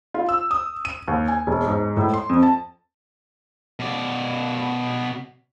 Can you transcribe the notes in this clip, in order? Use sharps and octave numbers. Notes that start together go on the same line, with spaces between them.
F4
E6
D#6
D#7
D#2
G#5
E1
G#2
A2
C6
F2
A5
B2 D5